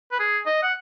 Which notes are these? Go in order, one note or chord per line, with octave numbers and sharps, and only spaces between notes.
B4
G#4
D#5
F#5